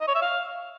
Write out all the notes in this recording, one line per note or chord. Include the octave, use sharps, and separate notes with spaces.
D#5
C#5
E5
F5